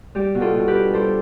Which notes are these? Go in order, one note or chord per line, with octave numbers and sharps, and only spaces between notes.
G3 G4
B2
F4 A4
B2
G4 B4
D4
G3 A4 C5